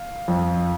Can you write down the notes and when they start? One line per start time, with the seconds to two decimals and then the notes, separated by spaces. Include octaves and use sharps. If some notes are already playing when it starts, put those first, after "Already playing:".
Already playing: F5
0.28 F2